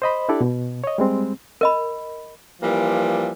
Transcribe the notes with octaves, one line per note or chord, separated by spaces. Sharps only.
C5 D#5 B5
D4 E4 G4 A4 D5
B2
C#5 D#5
G3 G#3 C4
A#4 D#5 B5
E3 F3 G3 A#3